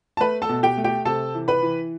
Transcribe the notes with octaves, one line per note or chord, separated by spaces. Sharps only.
A5
A3 B4 B5
A4 A5
B2
G4 G5
A3
G4 G5
C3 A4 A5
E3
B4 B5
E3